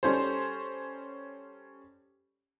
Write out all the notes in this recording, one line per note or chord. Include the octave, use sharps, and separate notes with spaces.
G3 C#4 A4 C5